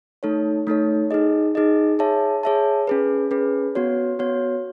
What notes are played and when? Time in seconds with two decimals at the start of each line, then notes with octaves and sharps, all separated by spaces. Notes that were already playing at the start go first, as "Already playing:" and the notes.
0.23 A3 D#4 A4 C#5
0.67 A3 D#4 A4 C#5
1.11 D#4 G#4 D#5
1.55 D#4 G#4 D#5
1.99 G#4 C#5 E5 A5
2.43 G#4 C#5 E5 A5
2.87 C#4 G#4 B4
3.31 C#4 G#4 B4
3.75 B3 F#4 C#5
4.19 B3 F#4 C#5